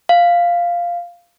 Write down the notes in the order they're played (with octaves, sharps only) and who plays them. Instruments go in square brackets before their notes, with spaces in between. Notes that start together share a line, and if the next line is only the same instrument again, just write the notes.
[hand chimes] F5